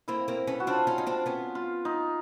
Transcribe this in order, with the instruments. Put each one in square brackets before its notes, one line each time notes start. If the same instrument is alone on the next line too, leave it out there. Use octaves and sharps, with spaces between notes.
[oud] A#3 C4 [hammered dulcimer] E4
[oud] A#3 C4
B3 C#4
[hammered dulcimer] F#4
[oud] C4 D4 [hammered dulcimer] F4
[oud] C#4 D#4
D#4
C4 D4
B3 C#4
[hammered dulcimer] F4
D#4